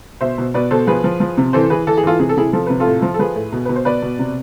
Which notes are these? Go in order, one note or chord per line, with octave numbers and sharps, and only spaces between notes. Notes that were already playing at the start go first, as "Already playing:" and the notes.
B2 C5 E5
B2
B2 B4 D5
B2 A4 C5
F3 G#4 B4
F3
F3
C3
E3 A4 C5
E3 G#4 B4
E3 A4
G#4
E3 F4 A4
C3 G#4
A4
C3 E4 G#4
F3 A4
C3 B4
F4 A4
A2
F3
A4
F3 G#4 B4
A2
B2
B2 B4
C5
B2 B4 D5
B2
C3